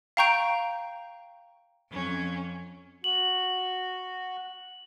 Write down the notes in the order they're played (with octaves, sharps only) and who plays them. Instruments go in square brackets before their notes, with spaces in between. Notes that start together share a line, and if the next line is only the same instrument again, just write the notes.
[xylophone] F5 G5 A#5 C#6 G6 D7
[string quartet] F2 C#4
[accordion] F#4 [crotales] F#7